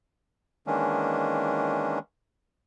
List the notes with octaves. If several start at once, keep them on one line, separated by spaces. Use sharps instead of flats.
D#3 E3 G#3 A#3 C#4 D4